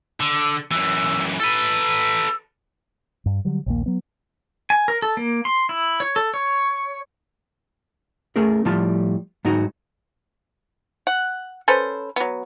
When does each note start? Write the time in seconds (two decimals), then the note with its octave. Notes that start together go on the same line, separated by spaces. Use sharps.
0.20 D3 E6
0.71 F#2 E3 E6
1.40 A4 B4 E6
3.26 G2
3.45 D3 F#3 G3
3.66 A#1 D#2 A#3
3.86 F#3 B3
4.70 G#5
4.88 A#4
5.02 A4
5.17 A#3
5.45 C6
5.69 E4
6.00 C#5
6.16 A4
6.34 C#5
8.36 A3 C#4 G#4 A#4
8.65 A2 F3 G3 F4 A5
9.45 G#2 F#3 D#4 F#4
11.07 F#5
11.68 C#4 A4 B4 C5
12.16 F#3 B3